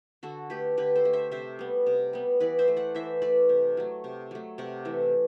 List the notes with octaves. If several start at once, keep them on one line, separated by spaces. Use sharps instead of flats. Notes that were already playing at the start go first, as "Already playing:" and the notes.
D3 F#4 A4
A3 G4 B4
D3 G4 B4
A4 C5
A3
C5 E5
C3 C5 E5
G3 B3
C3
G3 B3
E3 B4 D5
C5 E5
A3
D5 F#5
E3 C5 E5
A3 B4 D5
C3
F#3 A3
C3
F#3 A3
C3 D5 F#5
E3 A3